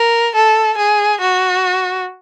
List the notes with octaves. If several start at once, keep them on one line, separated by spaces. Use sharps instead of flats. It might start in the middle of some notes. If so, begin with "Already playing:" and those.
Already playing: A#4
A4
G#4
F#4